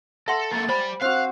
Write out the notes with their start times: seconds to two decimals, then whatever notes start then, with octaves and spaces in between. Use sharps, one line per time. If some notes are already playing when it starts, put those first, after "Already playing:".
0.28 A4 E5 F#5 C6
0.52 A#3 A4 A6
0.69 G3 C5 G#5 B5
1.02 C4 F#4 F5 F#6